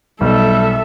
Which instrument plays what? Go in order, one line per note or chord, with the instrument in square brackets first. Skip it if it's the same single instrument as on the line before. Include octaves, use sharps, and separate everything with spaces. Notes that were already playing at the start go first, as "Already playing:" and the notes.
[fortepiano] B1 [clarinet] G3 [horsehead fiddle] A4 E5